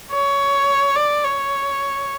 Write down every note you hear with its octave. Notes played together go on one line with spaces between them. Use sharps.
C#5
D5
C#5